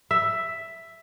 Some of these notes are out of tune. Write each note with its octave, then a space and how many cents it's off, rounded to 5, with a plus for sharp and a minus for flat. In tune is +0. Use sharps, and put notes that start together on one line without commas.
E5 +5